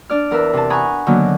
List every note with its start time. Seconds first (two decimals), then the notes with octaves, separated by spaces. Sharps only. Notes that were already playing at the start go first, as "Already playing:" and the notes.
0.09 D4 D5 F6
0.31 E2 A#4 B4 E5
0.54 C3 A5
0.70 F#5 G#5 A#5 B5 C#6 D#6
1.06 D3 D#3 F#3 A#3 B3